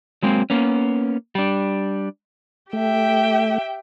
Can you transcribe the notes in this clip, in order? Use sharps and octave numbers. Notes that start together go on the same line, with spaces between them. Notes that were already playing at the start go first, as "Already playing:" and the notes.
F#3 G#3 A#3 C4
A#3 B3 C#4
G3 D4
A3 G4 E5 G5